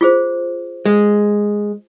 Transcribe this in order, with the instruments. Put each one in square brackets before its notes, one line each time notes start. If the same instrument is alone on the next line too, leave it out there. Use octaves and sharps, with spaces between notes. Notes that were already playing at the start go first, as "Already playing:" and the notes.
[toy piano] F4 G#4 C5
[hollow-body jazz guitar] G#3